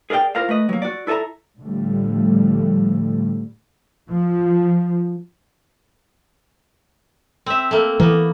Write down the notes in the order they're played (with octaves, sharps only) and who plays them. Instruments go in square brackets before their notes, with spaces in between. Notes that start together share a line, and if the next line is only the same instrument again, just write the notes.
[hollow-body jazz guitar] G#4 A#4 D5 E5 G5
E4 F4 A#4 C5 F5
A3 B4 D#5
F#3 A#3
F#4 D5
E4 A4 B4 E5 A#5
[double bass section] A2 D3 F3 G3 A3
F3
[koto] C4 E5
A3 A#3
[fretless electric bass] E3 [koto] A#3 B3